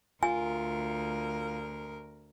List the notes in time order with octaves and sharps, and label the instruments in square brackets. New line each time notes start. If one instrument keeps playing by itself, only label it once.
[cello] D2 A#4 [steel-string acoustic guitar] F4 [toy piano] G#5